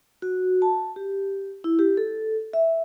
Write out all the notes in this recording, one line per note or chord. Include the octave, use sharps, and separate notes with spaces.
F#4
A5
G4
E4
G4
A4
E5